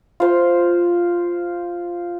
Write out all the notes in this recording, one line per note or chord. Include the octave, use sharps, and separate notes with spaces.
F4 C5